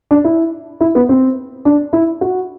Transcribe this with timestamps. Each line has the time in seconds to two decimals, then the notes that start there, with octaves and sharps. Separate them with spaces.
0.11 D4
0.24 E4
0.80 E4
0.95 B3
1.09 C4
1.65 D4
1.93 E4
2.21 F#4